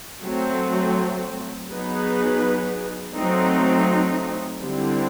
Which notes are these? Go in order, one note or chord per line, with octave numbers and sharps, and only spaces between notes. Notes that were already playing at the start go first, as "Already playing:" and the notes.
F#3 A3 C4
F#3 B3 D#4 G#4 B4
F#3 A3 C4 D#4
D3 G3 C4 E4 G4